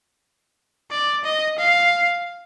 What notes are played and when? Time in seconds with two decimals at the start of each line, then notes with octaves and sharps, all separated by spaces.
0.91 D5
1.24 D#5
1.58 F5